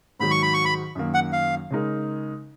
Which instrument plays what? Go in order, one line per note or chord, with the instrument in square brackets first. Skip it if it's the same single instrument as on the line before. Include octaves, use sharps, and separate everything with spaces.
[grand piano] G#2 D#3 F#3 [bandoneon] B5
[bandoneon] C#6
B5
C#6
B5
[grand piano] F#2 D#3 A#3
[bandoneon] F#5
F5
[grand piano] C#3 G#3 D#4 A#4